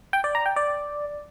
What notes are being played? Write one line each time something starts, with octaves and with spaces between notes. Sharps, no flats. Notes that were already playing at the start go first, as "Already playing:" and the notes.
G5
D5
A#5
G5
D5